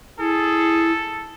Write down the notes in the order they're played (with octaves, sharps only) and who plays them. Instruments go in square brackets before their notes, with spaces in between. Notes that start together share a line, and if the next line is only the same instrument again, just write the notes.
[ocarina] E4 [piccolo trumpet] G#4 [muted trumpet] A4